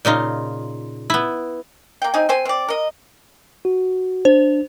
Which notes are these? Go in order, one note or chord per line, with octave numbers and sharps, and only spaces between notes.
A#2 C#3 D#4 F4
B3 E4
A#3 G5
C4 D#4 G#5
C4 C5 G#5
C4 D5
A#4 D#5
F#4
D4 C5